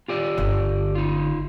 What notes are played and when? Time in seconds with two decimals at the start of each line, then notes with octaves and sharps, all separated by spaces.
0.08 F4 G4 D5
0.38 G1 D3
0.95 D#4 F4